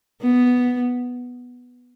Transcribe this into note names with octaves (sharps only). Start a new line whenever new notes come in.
B3